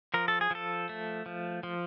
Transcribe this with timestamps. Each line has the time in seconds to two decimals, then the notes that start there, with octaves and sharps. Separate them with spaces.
0.14 F3 A#4
0.28 A4
0.41 G#4
0.51 F3 A4
0.89 A3
1.26 F3
1.63 F3